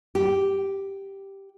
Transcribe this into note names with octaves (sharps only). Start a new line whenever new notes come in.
G4